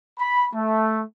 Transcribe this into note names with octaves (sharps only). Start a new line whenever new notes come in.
B5
A3